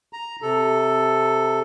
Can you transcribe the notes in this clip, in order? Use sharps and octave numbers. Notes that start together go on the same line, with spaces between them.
A#5
C3 A4